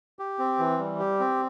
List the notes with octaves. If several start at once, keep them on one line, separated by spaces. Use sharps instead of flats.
G4
C4
E3
G3
G4
C4